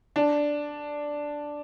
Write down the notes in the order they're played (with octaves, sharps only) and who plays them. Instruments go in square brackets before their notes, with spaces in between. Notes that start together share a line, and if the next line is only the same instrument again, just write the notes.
[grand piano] D4